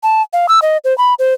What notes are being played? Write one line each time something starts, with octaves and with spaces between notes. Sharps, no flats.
A5
F5
E6
D#5
C5
B5
C5